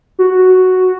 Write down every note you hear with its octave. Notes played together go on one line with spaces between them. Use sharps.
F#4